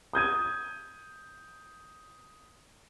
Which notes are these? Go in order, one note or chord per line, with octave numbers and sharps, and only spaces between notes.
D#6 G6 G#6 D#7